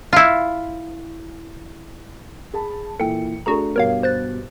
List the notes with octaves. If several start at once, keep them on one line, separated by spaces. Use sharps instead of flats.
E4 F4
G#4 A5 B5
A#2 E3 A4 G5 C#7
A3 D4 F#4 G#4 A4 A#5
G2 B2 A#4 C#5 F5
C5 F#6 A6